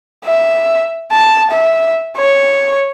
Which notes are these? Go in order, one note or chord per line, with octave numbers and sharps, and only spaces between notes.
E5
A5
E5
C#5